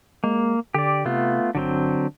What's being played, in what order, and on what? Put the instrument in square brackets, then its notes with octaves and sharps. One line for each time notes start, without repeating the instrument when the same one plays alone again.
[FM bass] G#3 [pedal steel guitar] A#3
[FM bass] D3 [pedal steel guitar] G4 D5
[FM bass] C3 [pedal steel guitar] A3 B3 F4
[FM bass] G1 [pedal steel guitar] D3 F#3 C4